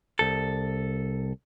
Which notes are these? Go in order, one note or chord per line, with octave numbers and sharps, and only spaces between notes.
C2 A4